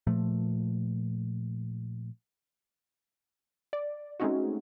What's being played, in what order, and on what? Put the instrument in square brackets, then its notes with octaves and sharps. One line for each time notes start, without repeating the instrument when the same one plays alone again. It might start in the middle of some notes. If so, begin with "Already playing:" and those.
[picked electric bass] A#2 F3 A3
[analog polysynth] D5
G#3 A3 C4 C#4 D#4 F#4